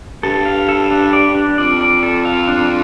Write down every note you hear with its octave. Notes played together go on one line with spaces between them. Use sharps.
G2 A4
F5
A4
D4
D5
D4
F2 D5
D5
A4
F5
D4